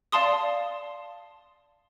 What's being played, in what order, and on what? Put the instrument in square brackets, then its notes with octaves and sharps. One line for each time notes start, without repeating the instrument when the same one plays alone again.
[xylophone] D5 F5 A5 C6 D#6